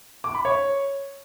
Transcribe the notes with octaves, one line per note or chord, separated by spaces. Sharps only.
D6
B5
C#5